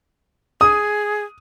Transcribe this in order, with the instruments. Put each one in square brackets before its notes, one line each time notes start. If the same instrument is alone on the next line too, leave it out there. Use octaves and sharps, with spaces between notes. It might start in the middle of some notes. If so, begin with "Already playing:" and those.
[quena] G#4 [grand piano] D#6